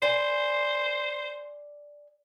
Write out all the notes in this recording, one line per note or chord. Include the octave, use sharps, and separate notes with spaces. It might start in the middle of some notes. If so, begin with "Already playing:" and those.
C5 D5 G#5